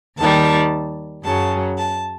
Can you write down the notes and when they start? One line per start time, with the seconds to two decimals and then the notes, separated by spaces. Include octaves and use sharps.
0.18 D#2 D#3 G3 A5
1.24 F#2 C#3 F#3 A5
1.77 A5